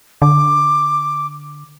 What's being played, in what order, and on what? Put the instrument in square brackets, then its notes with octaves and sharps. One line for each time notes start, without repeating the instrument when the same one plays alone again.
[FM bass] D3 [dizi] D6